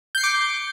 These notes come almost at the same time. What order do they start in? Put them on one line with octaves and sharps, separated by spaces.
G6 C7 C#7 D6